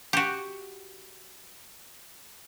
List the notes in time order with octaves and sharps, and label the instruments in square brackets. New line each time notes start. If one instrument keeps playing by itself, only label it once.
[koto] F#4 G4